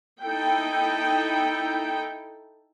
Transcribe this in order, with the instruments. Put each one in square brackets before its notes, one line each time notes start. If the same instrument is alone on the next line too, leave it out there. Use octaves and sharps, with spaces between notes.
[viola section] D#4 E4 A4 G5